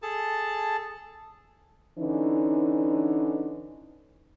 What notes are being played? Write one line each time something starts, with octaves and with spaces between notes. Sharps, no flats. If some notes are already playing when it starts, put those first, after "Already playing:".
G#4 A4 A5
D3 E3 C#4 D#4